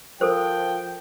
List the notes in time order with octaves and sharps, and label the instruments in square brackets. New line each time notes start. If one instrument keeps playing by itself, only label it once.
[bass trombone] F3 [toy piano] A4 A#4 C5 [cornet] G5